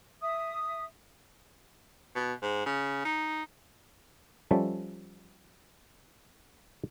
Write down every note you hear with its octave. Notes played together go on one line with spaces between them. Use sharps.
E5 D#6
B2
G#2
C#3
D#4
F3 G3 C#4 A4 E5